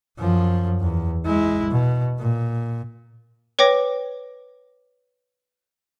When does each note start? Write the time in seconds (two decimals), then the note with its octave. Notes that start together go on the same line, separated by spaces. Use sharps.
0.19 F#2 F3
0.81 E2
1.25 G#3 E4
1.70 B2
2.19 A#2
3.59 B4 C#5 G5 D6 A#6